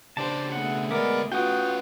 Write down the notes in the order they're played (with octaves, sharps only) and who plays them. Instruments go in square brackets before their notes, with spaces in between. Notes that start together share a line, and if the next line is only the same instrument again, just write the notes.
[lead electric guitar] C#3 D4 [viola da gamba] G4 C5 [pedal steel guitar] D5 A5
[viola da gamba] B2 A3 G#4 [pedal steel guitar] F#5
[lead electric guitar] D2 D5 [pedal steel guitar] G#3 B3 [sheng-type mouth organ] A#4 D6
[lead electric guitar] C#4 B4 [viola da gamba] F4 [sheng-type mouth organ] F#4 [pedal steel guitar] G5 D#6